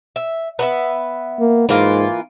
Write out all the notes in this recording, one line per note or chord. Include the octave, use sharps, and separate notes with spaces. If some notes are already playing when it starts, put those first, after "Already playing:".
E5
B3 B4 E5
A#3
G#2 E3 A#3 F4